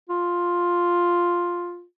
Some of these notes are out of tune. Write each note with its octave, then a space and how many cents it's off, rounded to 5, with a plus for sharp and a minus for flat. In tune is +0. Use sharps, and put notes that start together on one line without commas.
F4 +5